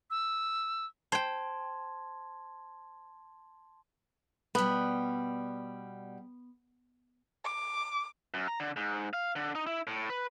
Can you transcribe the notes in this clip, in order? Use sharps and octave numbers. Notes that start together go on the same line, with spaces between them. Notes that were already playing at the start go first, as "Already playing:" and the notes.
E6
C5 G5 A5 C6 G#6
B2 G3 B3
D6
F#2
A#5
D3
G#2
F5
D3
D#4
E4
A2
B4